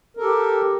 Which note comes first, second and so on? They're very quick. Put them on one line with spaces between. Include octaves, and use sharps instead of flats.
A#4 A4 G4